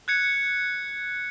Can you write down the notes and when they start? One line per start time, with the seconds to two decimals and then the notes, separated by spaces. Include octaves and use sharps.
0.08 F#6 G#6 C#7